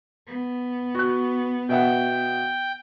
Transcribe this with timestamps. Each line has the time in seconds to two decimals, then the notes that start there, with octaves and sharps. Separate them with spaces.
0.27 B3
0.95 F#4 F#6
1.69 B2 E5 F#5 G5